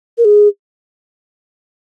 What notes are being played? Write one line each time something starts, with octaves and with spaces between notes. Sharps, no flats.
A#4
G#4